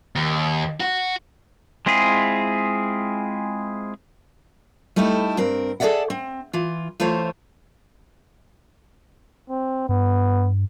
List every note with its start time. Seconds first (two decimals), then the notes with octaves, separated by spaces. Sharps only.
0.16 D#2
0.80 F#4
1.86 G#3 C4 E4 F4 G#4
4.96 G3 A3 D#4 E4 A4
5.38 G2 C4 A#4
5.80 G#4 A4 C#5 D5 E5 F#5
6.10 C4
6.53 E3 F4
7.00 E3 A3 F4 C5 C#5
9.50 C4
9.89 G2 B3